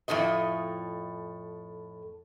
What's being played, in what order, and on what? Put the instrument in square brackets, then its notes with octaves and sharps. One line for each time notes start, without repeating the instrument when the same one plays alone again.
[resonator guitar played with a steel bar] F2 A2 C#3 A3 D#5